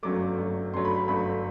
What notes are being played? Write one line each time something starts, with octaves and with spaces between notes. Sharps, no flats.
G1 F#2 F#3 A3 D6
G1 F#2 F#3 A3
G1 F#2 F#3 A3 C6
B5
B5
G1 F#2 F#3 A3 B5